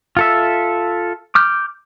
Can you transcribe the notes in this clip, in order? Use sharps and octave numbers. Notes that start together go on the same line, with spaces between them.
F4 A4 E5
D6 F6 G6